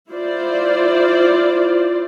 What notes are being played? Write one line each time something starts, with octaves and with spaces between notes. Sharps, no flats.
E4 F4 C5 D5